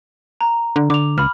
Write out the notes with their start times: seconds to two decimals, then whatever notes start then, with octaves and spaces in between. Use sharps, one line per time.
0.41 A#5
0.76 D3
0.90 D3 D6 F7
1.18 C#2 B5 F6